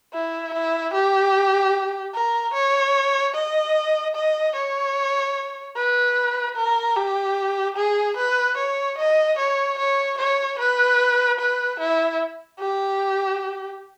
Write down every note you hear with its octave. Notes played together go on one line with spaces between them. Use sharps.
E4
E4
G4
A#4
C#5
D#5
D#5
C#5
B4
A#4
G4
G#4
B4
C#5
D#5
C#5
C#5
C#5
B4
B4
E4
G4